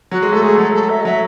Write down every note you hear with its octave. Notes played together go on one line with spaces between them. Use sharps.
F#3 F#4
G#3
A3 A4
G#3 G#4
F#3 A4
A4
E5
D#5
F#3 E5